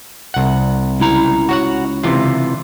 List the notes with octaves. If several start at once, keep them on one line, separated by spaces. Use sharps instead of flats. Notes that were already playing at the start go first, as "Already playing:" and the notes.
C2 F#5
C#2 E4 A#5
F#4 C#5 F#5
C3 E3 F4